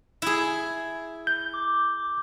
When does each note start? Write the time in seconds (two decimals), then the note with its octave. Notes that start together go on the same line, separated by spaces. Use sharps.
0.22 E4 G#4
1.27 G6
1.53 D6